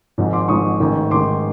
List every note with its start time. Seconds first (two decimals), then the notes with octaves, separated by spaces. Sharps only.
0.18 G#1 G#2 F3
0.33 C6 D6
0.48 G#1 G#2 F3 C#6 D#6
0.80 A1 G#2 D#3
1.11 A1 G#2 D#3 C6 D6